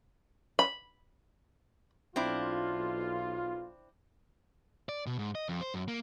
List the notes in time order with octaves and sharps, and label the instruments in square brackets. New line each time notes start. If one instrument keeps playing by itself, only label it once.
[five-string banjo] B5
[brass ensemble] B1 F4 [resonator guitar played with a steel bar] C4 D4 E4
[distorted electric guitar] D5
B2
G#2
D#5
F2
C5
F#2
A#3